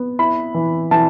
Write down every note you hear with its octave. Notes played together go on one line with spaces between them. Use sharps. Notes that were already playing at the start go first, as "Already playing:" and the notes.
Already playing: B3
E4 B5
E3
E3 A5